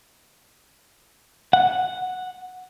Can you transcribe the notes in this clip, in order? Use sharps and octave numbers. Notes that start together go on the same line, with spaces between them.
F#5